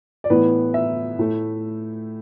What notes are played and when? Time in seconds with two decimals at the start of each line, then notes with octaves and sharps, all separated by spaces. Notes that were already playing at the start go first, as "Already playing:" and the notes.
0.24 D5
0.30 A2 E3 B3 B4
0.74 E5
1.19 A2 A3